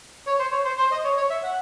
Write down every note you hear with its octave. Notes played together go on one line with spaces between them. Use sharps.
C#5
C5
C#5
C5
C5
D#5
C#5
C#5
E5
F#5